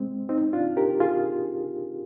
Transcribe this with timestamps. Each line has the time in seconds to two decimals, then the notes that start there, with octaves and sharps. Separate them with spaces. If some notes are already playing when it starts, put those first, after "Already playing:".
Already playing: G#3 C4
0.29 C4 D#4
0.53 D4 F4
0.77 G4 A#4
1.00 F4 G#4